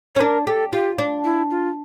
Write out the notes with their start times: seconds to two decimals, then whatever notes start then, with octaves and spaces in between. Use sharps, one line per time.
0.15 C#4 C#5
0.20 D4 A#4
0.46 G4 A4
0.72 F4 G4
0.98 D4
1.24 E4
1.50 F4